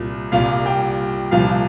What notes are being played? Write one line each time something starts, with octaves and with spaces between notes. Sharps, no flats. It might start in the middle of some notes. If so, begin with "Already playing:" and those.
Already playing: C2 A#2
C2 A#2 G3 F5
G5
C2 A#2 F3 F5